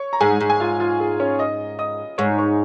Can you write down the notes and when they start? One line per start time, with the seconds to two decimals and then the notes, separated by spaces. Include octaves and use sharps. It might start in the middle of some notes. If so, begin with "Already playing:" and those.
Already playing: C#5 C#6
0.13 A#5
0.21 G#2 G#4 G#5
0.40 G#2
0.50 G#5
0.60 F4 F5
0.80 F4
1.00 G#4
1.20 C#4 C#5
1.39 D#5 D#6
1.79 D#5 D#6
2.18 G#2 C#5 C#6
2.38 C#5 C#6